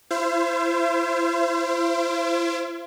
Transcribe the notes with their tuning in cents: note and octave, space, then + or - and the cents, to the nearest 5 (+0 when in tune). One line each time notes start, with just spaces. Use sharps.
E4 +40 C5 +0 F5 -45